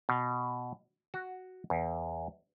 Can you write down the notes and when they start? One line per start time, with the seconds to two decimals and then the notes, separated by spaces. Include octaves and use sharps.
0.09 B2
1.14 F#4
1.70 E2